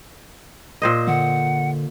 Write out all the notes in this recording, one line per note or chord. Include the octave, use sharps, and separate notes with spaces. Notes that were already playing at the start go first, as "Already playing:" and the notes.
A#2 C5 D#5
D3 F#5